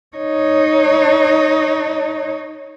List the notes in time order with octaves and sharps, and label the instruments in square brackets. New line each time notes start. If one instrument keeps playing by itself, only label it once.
[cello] D#4 C#5